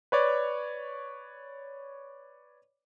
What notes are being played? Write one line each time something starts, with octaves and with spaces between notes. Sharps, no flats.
B4 C#5 D5